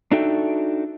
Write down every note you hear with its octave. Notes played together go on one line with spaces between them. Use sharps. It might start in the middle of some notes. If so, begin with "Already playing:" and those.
D4 D#4 F#4 A4 E5 G5